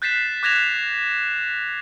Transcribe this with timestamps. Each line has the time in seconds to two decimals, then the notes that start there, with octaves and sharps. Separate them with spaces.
0.02 F#6 G6 A6 B6 C7 E7
0.43 D6 F#6 G#6 A#6 E7 F7